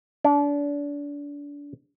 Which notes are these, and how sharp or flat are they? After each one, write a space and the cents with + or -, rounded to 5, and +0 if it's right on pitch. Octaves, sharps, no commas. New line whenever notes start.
D4 -30